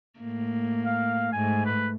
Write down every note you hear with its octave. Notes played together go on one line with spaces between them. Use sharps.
A2 A#3
F5
G#2 A3 G#5
B4